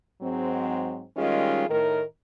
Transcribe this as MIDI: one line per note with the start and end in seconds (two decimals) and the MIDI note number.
0.22 1.03 44
0.22 1.03 54
0.22 1.03 60
1.17 1.69 51
1.17 1.69 55
1.17 1.69 56
1.17 1.69 61
1.17 1.69 65
1.17 1.69 68
1.69 2.02 45
1.69 2.02 51
1.69 2.02 70